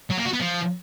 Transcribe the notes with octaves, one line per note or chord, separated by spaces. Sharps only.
F#3
A#3
F#4
B3
F3